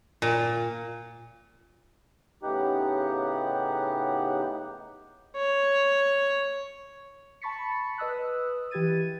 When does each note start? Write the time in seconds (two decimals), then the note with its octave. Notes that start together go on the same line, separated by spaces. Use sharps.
0.22 A#2
2.43 A2 C#3 B3 D#4 G4 F#5
5.36 C#5
7.42 A5 B5 C#6 A6 B6 C#7
7.98 B4 D#5 D#6 E6 F#6
8.71 E3 G4 B4 G#6 A6 D#7